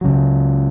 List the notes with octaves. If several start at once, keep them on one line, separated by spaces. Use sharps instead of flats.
C#2 C#3 F#3